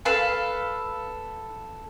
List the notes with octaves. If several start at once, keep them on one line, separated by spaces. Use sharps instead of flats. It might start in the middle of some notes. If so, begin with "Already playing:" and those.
A4 B4 F5 A5